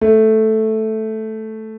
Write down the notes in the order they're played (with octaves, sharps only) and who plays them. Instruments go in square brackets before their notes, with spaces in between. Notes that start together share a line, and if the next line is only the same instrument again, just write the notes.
[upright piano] A3